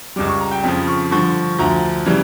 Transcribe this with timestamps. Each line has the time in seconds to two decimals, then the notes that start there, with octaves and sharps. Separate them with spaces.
0.16 C#2 C#3 G3 D6
0.28 C#6
0.40 A#5
0.51 G5
0.63 F2 C#3 F3
0.88 C#6
1.11 G2 D3 F3 C#6
1.58 D2 D3 F3 A#5
2.06 C#3 E3 G3